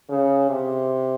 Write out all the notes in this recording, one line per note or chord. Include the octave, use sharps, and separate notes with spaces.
C#3
C3